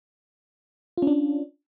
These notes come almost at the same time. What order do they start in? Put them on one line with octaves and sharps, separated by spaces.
F4 C#4 D4